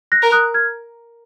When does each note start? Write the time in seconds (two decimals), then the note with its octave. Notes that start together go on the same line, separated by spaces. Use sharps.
0.12 F#6 A#6
0.23 A#4
0.32 D#6 F#6
0.54 F6 G#6